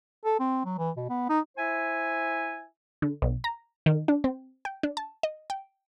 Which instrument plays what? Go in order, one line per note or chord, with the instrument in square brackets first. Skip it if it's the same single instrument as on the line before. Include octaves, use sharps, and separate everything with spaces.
[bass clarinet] A4
C4
F#3
E3
B2
B3
D#4
[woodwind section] E4 C5 E5 G#5
[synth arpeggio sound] D3
B1
A#5
D#3
D4
C4
G5
D4
A5
D#5
G5